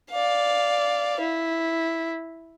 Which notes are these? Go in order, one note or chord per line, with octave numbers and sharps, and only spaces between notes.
D5 F5
E4